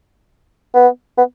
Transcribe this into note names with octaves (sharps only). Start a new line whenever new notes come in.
B3
B3